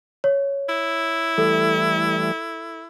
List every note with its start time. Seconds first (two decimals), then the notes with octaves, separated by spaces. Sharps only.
0.24 C#5
0.69 E4
1.38 E3 G3 A3 A4